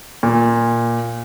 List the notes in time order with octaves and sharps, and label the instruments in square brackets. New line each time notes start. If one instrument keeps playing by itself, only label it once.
[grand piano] A#2